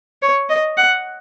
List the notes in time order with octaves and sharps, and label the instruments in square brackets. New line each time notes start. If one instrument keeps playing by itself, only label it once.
[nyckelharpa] C#5
D#5
F#5